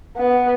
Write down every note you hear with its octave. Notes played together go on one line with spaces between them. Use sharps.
B3